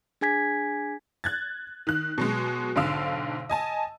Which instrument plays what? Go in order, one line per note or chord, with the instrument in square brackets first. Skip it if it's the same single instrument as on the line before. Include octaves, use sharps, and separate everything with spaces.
[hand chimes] D4 G#4 G#5 G#6 B6
[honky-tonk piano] F#6 G#6 A6
D#3 F#6
B2 F#3 G#3
B1 G#2 D3 F5 E6
D#5 G#5 A5